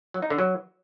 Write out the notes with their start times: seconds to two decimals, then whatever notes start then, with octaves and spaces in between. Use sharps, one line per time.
0.14 F#3
0.22 D#4
0.30 D3
0.38 F#3